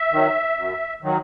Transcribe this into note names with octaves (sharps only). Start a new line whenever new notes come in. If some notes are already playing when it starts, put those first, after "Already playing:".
Already playing: E5
D#3 F#3
F#2
D#3 F#3